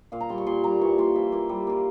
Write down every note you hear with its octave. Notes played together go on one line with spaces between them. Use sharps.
A#2 F5
A#5
G3 A#3 C6
C#6
A#2 C6
G3 A#3 A#5
E3 C#6
A#3 F4 C6
E3 E5
A#3 F4
G3
A#3 F4